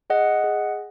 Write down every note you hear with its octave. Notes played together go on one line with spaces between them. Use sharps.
G#4 D#5 F#5
G#4